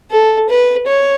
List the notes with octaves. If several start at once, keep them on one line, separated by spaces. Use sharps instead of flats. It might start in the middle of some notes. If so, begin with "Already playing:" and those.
A4
B4
C#5